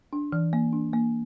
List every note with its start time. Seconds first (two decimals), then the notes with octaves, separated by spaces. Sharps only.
0.13 D4
0.32 E3
0.53 A#3
0.73 D4
0.93 A#3